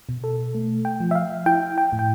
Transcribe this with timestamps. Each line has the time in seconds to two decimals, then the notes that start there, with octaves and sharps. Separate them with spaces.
0.09 B2
0.24 A4
0.55 A3
0.85 G5
1.00 F3
1.11 E5
1.15 F5
1.46 E4 G5
1.78 G5
1.93 A2
1.99 G5